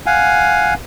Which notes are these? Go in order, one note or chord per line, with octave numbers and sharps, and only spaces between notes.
F5 F#5 G#5